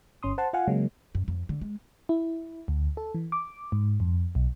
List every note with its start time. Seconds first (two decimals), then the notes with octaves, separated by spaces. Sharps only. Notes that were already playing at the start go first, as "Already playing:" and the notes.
0.23 G1 C#4 C6 D#6
0.38 C5 F#5 A5 C6
0.53 F4 F5 F#5 G#5
0.68 C#3 F#3 G#3 A#3 C#4
1.15 F#2
1.28 F2
1.49 D3
1.61 G#3
2.09 E4
2.68 D2
2.97 A4
3.14 E3
3.32 D6
3.72 G#2
4.00 F2
4.35 B1